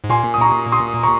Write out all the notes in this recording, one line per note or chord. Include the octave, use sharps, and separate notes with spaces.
G#2
A#2 G#5 C6
D#6
A#5 C#6
C6 D#6
A#5 C#6